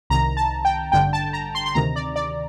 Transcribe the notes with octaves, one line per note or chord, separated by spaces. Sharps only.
C2 C3 D#3 A#5
A5
G5
A1 G2 D3 G5
A5
A#5
C6
C6
D2 C3 D#3 A#5
D5
D5